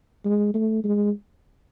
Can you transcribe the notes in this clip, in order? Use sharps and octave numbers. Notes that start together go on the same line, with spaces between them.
G#3
A3
G#3